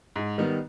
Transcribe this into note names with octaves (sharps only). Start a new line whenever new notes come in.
G#2
D#3 G3 B3 D#4